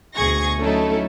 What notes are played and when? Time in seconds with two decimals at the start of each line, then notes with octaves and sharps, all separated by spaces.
0.14 D2 B2 G#4 C#6 G#6 A#6
0.60 F#3 A3 C#4 D#4 E4 A4